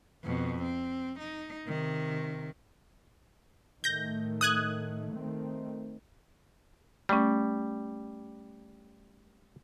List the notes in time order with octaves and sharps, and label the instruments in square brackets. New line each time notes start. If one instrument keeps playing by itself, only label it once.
[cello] F2 B2
C4
D#4
C3 D#3
[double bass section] A2 D#3 A3 [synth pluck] G6 A#6
[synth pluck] D#6 F#6 G#6
[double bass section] D#3 A3 C4
[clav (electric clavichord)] G3 [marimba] A3 C#4